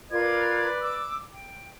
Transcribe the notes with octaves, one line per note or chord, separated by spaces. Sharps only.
F4 A#4 B4 D5 G#6
D6 E6
G5